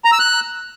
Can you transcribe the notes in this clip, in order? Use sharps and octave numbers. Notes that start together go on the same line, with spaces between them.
A#5
E6
F#6